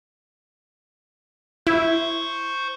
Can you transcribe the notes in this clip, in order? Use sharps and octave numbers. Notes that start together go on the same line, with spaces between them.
E4 C5 C#6